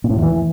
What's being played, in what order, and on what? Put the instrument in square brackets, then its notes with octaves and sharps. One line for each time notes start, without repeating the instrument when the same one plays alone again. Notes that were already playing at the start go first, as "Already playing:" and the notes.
[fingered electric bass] A#2
A2
E2
E3